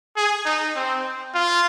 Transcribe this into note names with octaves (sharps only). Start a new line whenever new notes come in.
G#4
D#4
C4
F4